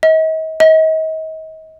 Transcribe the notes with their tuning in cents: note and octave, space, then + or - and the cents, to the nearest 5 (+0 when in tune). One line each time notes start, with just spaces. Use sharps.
D#5 +40
D#5 +35